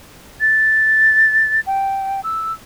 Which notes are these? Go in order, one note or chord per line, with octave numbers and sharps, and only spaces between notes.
A6
G5
E6